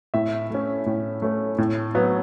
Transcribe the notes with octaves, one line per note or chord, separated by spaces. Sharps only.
A2 E5
A3 C#4
A2
A3 C#4
A2
F#3 B3